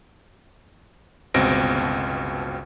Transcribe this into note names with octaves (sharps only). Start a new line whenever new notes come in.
G1 C#2 B2 C4 A#6 D7